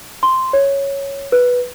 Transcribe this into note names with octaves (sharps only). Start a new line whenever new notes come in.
C6
C#5
B4